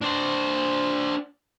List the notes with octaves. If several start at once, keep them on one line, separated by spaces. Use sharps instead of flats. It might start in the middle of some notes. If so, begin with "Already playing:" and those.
D4 C5